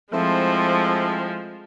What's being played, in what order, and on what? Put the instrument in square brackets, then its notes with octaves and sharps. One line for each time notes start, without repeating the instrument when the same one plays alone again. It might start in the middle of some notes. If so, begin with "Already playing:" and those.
[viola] F3 G#3 [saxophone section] A3 C4 E4